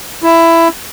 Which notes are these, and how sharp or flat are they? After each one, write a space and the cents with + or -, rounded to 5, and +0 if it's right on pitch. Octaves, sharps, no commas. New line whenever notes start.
E4 +15